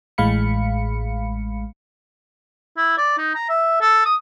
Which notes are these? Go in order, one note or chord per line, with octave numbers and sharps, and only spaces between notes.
A1 A2 G#3 F5 B5 C#7
E4
D5
D#4
A#5
E5
A4
D#6